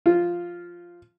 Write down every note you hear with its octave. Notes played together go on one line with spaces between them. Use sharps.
F3 F4